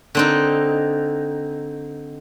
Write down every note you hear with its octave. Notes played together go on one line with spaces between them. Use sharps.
D3 C4 D#4